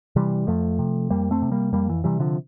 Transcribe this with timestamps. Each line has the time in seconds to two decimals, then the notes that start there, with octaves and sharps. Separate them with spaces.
0.16 C3 E3 G3
0.47 F2 F3 A3
0.79 C3
1.10 F2 G3 A#3
1.31 A3 C4
1.42 C3
1.51 G3 A#3
1.73 F2 G3 A#3
1.89 E3
2.04 C3 E3 G3
2.20 D3 F3